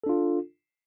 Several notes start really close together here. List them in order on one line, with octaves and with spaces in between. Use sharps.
A4 D4 F4